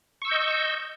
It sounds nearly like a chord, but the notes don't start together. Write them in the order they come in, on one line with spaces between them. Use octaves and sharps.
C#6 E6 G6 D#5